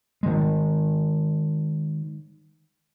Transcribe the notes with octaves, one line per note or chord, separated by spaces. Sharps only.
D#3 G#3